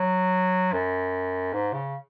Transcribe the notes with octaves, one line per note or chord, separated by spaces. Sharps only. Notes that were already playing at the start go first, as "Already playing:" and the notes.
Already playing: F#3
F#2
G#2
C#3